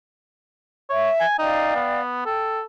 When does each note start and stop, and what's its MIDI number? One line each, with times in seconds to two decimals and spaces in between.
0.90 1.10 73
0.90 1.24 76
1.20 1.37 80
1.39 1.75 63
1.39 2.01 74
1.39 2.01 77
1.39 2.01 79
1.75 2.21 59
2.26 2.62 69
2.26 2.59 79